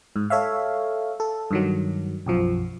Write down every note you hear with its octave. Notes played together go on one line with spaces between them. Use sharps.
G#2
A4 C#5 E5 F5
A4
G2 D#3 F#3
B1 F#2 F3